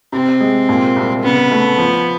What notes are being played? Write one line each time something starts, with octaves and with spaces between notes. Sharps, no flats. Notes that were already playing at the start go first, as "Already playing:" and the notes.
C3 C4
G#3
A#2
C2
C#3 B3
A3
F3